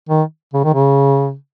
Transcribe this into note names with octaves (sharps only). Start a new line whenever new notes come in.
D#3
C#3
D#3
C#3